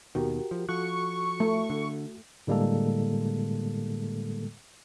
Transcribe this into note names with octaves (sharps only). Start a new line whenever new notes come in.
D#2 B2 D#3 F#4 G4 A#4
F3
F3 F#4 A4 C#6 F#6
A3
D3
A2 D3 G3 G#3 A#3 A4